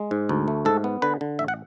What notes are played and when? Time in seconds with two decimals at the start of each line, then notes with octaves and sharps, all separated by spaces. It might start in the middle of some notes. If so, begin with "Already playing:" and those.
Already playing: G#3
0.11 G#2
0.29 D2
0.48 A3
0.65 G#2 A4
0.84 B3
1.02 D3 B4
1.21 D3
1.39 A1 E5
1.48 F#5